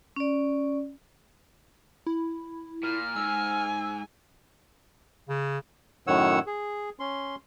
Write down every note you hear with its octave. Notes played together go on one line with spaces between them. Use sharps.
C#4 D5
E4
A#2 F6
G#2 G#5 E6
C#3
F#2 A2 D#3 C#5 F#5 E6
G#4
C#4 C6